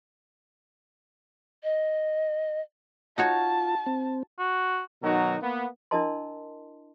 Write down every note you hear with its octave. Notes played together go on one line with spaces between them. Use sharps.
D#5
D#4 F4 F#4 C#5 A5
C4
F#4
B2 D#3 F#3 D#4 F#4 A#4
A#3 B3
D4 E4 A#4 D#5 A5 C6